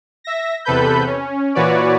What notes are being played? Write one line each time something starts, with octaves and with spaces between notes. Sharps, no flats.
E5 A#6
E2 C3 A4 B4 B5 G6
C#4
A#2 E3 F#4 B4 C#5 D5